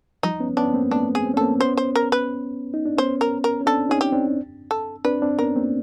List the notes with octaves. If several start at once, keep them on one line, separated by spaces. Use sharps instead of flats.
F3 G3 D#4
B3 C#4
B3 C#4 D4
A#3 C4
A3 B3 D4
G#4
C4
C#4
A#3 C4 A4
B3 C#4 C5
C5
A#4
B4
D#4
D4
B3 C#4 C5
A#4
A#4
C#4
C4 D4 A4
C#4 D#4 G#4
G4
C4 D4
A4
C4 D4 B4
C4 D4
B3 C#4 A#4
A#3 C4